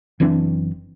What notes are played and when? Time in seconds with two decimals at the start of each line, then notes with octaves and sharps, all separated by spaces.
0.20 F#1 E3 C4 D4